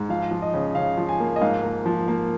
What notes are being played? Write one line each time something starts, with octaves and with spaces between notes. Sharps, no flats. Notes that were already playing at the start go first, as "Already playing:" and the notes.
Already playing: G#2
F3 F5
F3
D#5
C#3
C#3 F5
F3
G#5
A#3
D#5
G#2 F5
A#3
F3
A#3